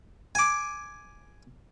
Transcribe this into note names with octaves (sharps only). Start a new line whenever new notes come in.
G#5 D6